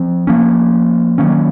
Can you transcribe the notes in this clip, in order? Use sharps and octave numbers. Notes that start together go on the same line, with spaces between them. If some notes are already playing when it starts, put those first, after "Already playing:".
Already playing: F3 C4
F3 A#3 C#4
D#3 F#3 A#3 C#4